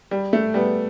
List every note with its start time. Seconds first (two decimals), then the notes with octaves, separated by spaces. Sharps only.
0.11 G3
0.33 A3
0.54 G3 B3